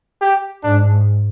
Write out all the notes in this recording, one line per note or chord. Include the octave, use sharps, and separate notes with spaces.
G4
G#2 D4